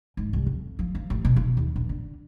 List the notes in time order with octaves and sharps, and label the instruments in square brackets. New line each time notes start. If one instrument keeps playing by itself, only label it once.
[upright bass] G#2
C2
F2
F3
F3
A1
B2
F4
D#2
A#1
D3